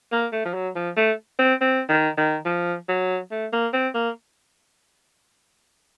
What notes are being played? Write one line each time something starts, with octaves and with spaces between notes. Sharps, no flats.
A#3
A3
F3
F#3
F3
A3
C4
C4
D#3
D#3
F3
F#3
A3
A#3
C4
A#3